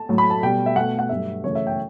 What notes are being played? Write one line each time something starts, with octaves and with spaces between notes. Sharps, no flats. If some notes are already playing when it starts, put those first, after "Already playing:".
Already playing: A5
A2 F#3 A3
B5
A5
B2 G3 G5
E5
B2 A3 F#5
F#5
G2 F#3 A3 E5
F#2 C#3 E3 A3 C#5
E5
G5